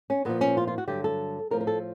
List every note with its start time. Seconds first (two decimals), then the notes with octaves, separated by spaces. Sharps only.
0.10 C#4
0.25 A#2 F3 B3
0.41 C#4
0.57 F4
0.67 F4
0.78 F#4
0.87 G2 D3 F#3 G4
1.04 A4
1.51 A2 F3 A#4
1.61 A#4
1.67 A4